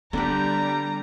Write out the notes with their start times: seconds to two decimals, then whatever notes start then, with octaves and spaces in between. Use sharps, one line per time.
0.13 D3 G3 B3 D4 B4 A#5